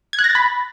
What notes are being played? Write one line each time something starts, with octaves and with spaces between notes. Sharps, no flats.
G#6
F#6
A#6
A6
B5